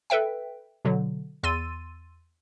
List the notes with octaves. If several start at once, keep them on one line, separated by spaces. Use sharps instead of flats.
A4 B4 E5 G5
B2 D3 F#3
E2 C6 E6 A6 D#7